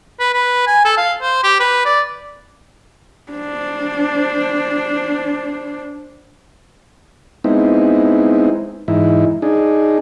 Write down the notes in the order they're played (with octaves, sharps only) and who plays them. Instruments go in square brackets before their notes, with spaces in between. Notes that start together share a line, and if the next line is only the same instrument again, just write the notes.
[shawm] B4
B4
G#5
A4
F5
C5
G4
B4
D5
[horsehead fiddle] D4 C5
[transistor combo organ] G#3 B3 C4 D#4 E4
G#2 E3 D#4 E4
D4 D#4 G#4